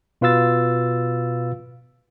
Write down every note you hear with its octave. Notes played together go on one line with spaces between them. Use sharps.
B2 F4 B4 F5 E6 A6